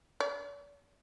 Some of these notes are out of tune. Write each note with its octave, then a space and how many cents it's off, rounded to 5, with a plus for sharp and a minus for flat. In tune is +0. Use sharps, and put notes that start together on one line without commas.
D5 -45